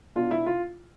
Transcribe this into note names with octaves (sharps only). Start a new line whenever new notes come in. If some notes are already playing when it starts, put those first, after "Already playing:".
B2 B3 D4 F4
E4
F4